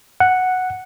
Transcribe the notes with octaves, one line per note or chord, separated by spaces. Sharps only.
F#5